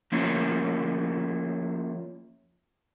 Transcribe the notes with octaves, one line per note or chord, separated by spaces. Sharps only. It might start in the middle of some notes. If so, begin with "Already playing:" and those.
F3 A#3 C#4 E4